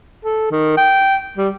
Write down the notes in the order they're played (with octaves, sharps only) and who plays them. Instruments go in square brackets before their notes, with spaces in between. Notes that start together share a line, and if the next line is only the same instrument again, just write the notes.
[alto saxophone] A4
D#3
G5
G3